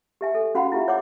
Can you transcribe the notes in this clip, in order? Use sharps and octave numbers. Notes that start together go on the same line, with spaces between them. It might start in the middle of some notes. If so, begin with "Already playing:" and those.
G4 E5 G#5
A4
C#4 F#4 F5 F#5 B5
E4 F4 G4 E5
C#5 F#5 D6